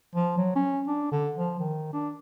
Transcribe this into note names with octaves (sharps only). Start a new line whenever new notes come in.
F3
F#3
C#4
D4
D3
F3
D#3
D4